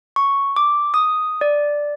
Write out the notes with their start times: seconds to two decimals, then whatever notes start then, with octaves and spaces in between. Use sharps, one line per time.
0.16 C#6
0.56 D6
0.94 D#6
1.41 D5